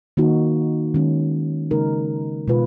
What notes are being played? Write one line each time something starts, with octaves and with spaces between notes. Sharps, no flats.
D#3 A#3 D#4 F#4
D#3 G#3 C#4
C#3 G#3 D#4 A#4
B2 G#3 B3 F4 B4